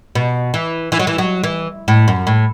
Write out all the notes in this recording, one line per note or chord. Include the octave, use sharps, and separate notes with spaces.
B2
E3
E3
F#3
E3
F#3
E3
A2
F#2
A2